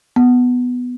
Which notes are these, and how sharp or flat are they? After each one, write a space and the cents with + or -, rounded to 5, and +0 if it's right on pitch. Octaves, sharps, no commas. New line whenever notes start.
B3 +5